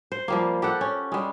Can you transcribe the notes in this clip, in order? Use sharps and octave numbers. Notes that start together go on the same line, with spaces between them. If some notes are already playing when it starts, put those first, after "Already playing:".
C5
F3 G3 A#3
G4 A4 D5 F#5
C#4
G3 G#3